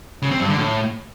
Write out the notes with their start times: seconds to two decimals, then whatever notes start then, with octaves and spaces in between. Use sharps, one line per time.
0.22 C#3
0.31 C4
0.40 G2
0.48 D3
0.57 A2